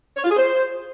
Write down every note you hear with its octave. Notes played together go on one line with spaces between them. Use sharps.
C#5
F4
G#4
C5